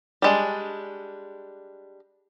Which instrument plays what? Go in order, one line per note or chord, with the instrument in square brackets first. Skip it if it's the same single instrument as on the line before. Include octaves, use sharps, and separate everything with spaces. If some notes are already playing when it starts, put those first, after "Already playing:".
[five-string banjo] G3 G#3 D4